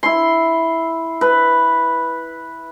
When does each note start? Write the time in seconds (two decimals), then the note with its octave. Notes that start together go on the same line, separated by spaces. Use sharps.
0.03 E4 C6
1.21 B4